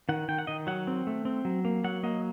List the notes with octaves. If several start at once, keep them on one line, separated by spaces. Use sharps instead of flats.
D#3 F#5
D#3 G5
F#5
D#3 D#5
F#3 F#5
C4
A3
C4
F#3
A#3
F#3 F#5
A#3 D#5